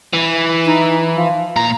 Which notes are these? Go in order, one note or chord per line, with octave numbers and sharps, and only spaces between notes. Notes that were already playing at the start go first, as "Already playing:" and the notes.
E3
D#4
F3
A#2 A#5